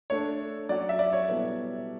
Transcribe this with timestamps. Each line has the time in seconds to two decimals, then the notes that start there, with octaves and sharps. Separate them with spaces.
0.10 A3 D4 A4 C#5 D5
0.69 F#3 C#4 F#4 D5
0.89 E5
0.99 D5
1.13 C#5
1.29 B2 G3 B3 E4 A4